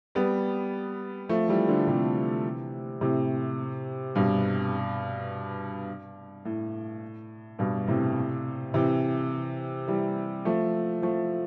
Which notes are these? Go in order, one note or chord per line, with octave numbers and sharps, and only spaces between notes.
G3 B3
F3 A3
E3 G3
D3 F3
C3 E3
A2 C3
G2 B2
A2
G2 B2
A2 C3
C3 E3
E3 G3
F3 A3
F3 A3